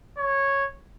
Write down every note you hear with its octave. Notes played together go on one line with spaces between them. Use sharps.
C#5